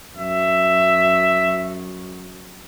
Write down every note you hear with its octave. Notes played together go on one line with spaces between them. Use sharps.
F#2 E5